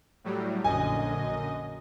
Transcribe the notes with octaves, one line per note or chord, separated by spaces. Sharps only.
A2 F#3 G3
A#1 F#2 D3 D#5 G#5